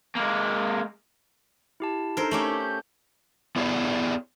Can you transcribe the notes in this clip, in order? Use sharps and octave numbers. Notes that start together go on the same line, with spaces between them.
G#3 A#3
E4 G4 A5
D4 D#4 A4 A#4 C5
A3 C#4 G4
G6
B3 E4 G4 G#4 C#5 D5